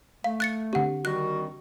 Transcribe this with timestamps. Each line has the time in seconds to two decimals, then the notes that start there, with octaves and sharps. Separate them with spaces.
0.24 A3 F5
0.40 F#6 A6 C#7
0.73 D3 C4 G4 F#5
1.05 D#3 G3 F#4 F#6